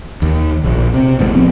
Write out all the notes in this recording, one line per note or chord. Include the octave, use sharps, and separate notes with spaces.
D#2
A#1
C3
A1 B2 G#3
A#1 F3 B3 C4